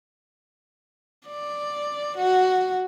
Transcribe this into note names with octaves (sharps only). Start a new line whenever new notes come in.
D5
F#4